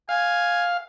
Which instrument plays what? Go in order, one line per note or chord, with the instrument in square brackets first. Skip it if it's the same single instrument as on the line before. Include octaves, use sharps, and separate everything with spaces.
[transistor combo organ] F5 [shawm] G#5